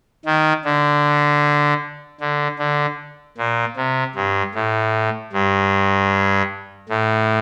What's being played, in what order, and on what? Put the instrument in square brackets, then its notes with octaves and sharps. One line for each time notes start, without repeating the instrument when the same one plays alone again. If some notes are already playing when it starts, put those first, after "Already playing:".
[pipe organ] D#3
D3
D3
D3
A#2
C3
G2
A2
G2
A2